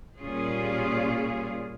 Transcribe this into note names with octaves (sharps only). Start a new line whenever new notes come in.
A#2 G3 C#4 F4 G#4